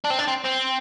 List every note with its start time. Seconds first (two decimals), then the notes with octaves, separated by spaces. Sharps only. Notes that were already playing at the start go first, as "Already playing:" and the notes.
0.04 D4
0.10 C4
0.19 D4
0.28 C4
0.45 C4